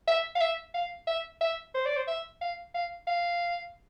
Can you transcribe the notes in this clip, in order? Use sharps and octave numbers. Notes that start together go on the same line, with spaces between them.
E5
F5
E5
F5
E5
E5
C5
D5
C5
E5
F5
F5
F5